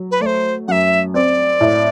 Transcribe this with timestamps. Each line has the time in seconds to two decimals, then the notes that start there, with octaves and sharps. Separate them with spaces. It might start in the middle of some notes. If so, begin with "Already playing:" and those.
Already playing: F#3
0.11 B4
0.21 A3 D5
0.26 C5
0.68 F#2 E5 F#5
1.14 C4 D5
1.61 A2